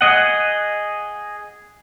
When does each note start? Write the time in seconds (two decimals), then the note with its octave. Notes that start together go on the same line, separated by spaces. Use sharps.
0.01 G#4 D#5 F#5